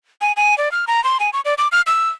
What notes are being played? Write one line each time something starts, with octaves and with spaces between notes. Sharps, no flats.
G#5
G#5
D5
F6
A#5
C6
G#5
C#6
D5
D6
F6
E6